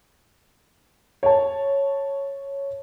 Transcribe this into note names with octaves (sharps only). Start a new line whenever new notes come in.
C#5 A5